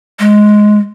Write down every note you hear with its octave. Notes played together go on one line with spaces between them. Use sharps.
G#3